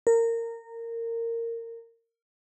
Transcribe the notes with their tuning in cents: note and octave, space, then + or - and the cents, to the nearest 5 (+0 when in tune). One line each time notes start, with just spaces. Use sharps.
A#4 -20